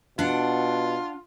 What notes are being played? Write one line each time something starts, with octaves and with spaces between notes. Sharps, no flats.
B2 D4 F4 F#5